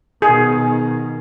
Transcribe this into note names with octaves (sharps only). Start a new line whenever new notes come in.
B2 D#3 G#4